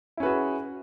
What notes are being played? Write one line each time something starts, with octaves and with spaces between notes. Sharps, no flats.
C#4 E4 F#4 G#4 B4